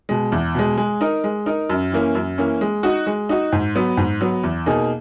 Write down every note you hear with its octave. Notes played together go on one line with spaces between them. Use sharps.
B2 G#3
E2
B2 G#3
G#3
D#4 A#4
G#3
D#4 A#4
F#2
E3 A#3 C#4
F#2
E3 A#3 C#4
G#3
D#4 F#4
G#3
D#4 F#4
G#2
F#3 B3
G#2
F#3 B3
E2
B2 A#3 D#4 G#4